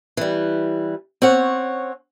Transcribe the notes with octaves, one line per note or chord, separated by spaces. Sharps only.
E3 G3
C4 C#4 C#5 F#5